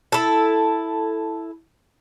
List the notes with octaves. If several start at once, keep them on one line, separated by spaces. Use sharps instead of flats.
E4 A4